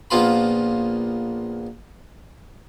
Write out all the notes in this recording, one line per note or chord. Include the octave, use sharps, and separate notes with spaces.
A#1 A#3 B3 F4 B5